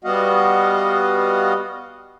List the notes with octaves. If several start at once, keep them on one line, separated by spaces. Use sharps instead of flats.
G3 B3 F#4 D#5 F5 F#5